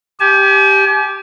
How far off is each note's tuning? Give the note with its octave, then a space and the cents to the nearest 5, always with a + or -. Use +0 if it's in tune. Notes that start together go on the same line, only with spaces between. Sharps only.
G4 +0 G#5 +40